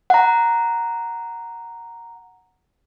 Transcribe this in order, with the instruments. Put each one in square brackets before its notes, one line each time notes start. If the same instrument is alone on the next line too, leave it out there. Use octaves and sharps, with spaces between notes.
[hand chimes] F#5 A#5